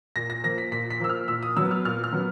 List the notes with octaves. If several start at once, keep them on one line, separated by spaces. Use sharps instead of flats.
A#2 A#6
A#6
F3 A#3 A#6
B6
A#2 B6
B6
F3 A#3 E6
F6
A#2 E6
D#6
F#3 B3 E6
F6
A#2 F6
F6
F#3 B3